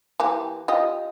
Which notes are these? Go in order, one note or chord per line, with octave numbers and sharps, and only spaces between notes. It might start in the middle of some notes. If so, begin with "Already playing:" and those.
E3 A#3 G4
F4 G4 D#5